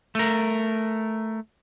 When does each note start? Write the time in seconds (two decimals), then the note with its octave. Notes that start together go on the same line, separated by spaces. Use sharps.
0.15 A3 A#4